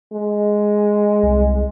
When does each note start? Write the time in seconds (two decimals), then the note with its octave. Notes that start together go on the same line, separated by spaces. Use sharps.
0.13 G#3
1.23 C2